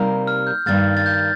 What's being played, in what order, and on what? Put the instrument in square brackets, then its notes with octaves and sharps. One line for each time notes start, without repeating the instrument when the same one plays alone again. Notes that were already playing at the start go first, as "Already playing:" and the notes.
Already playing: [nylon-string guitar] C3 G3 A#3 D#4 A#4
[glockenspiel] F6
G6
[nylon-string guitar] G2 D#3 A#3 [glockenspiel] F6 A6
[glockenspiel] A6
G6